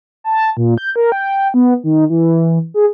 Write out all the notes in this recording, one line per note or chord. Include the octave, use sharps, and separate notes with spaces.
A5
A#2
G6
A#4
G5
B3
D#3
E3
G#4